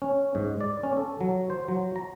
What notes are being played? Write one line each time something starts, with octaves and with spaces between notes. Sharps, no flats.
C#4
G#2
D5
C#4
A4
F#3
C5
F#3
A#5